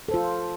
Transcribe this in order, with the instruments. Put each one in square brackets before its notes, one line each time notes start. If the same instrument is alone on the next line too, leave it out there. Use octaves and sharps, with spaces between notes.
[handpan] A4
C5
F4